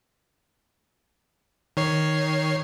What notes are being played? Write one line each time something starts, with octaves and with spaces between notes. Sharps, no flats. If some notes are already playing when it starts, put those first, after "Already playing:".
D#3 C#5 C7